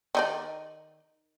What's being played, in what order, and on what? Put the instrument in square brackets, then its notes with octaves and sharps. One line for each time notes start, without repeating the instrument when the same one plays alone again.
[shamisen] D#3 D#4 D5